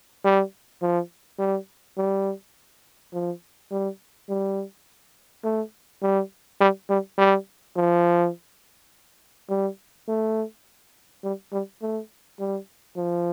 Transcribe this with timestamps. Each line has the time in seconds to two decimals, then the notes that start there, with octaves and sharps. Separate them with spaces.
0.24 G3
0.82 F3
1.39 G3
1.97 G3
3.13 F3
3.71 G3
4.29 G3
5.44 A3
6.02 G3
6.60 G3
6.89 G3
7.18 G3
7.76 F3
9.50 G3
10.08 A3
11.23 G3
11.52 G3
11.82 A3
12.40 G3
12.96 F3